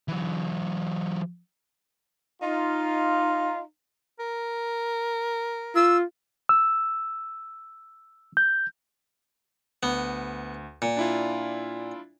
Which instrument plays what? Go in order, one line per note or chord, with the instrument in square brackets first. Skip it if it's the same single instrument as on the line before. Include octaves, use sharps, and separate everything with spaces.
[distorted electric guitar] E3 F#3
[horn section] D#4 F4
[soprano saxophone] A#4
[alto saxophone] F4 [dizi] E6
[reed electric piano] E6
G6
[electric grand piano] D2 [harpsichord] B3
[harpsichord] A#2
[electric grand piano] D4 E4 F4